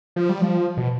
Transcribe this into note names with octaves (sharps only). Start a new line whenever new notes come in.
F3
G3
F3
B2